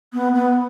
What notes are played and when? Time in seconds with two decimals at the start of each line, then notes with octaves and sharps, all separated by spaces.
0.13 B3
0.34 B3